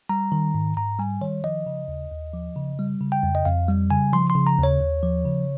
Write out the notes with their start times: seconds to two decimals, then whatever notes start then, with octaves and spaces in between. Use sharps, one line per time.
0.09 G3 A#5
0.32 D#3
0.55 G#2
0.77 G#2 A#5
0.99 G3 G#5
1.22 D#3 C#5
1.44 F3 D#5
1.66 C#3
1.88 D#2
2.11 D#2
2.33 F3
2.56 C#3
2.79 G3
3.01 C#3
3.12 G5
3.23 F2
3.35 D#5
3.45 F2 F5
3.68 G3
3.90 C#3 G#5
4.13 F3 C6
4.30 C6
4.35 C#3
4.47 A#5
4.58 D#2
4.63 C#5
4.80 D#2
5.03 F3
5.25 C#3